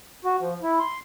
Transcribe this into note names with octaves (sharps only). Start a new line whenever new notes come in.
F#4
F3
E4
C6